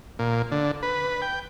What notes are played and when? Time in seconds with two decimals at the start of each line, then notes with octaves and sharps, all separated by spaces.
0.19 A#2
0.52 D3
0.83 B4
1.22 G5